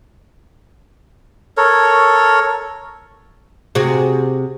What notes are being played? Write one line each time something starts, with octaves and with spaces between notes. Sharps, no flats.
A4 A#4 C#5
C3 F#4 G#4